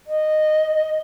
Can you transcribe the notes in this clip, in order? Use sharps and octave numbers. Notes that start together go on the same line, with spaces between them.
D#5